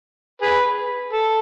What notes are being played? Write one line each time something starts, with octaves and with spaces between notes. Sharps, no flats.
G#4 B4
A4